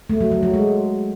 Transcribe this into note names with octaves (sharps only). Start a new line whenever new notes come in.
A3
F#3
F#3
F#3
G#3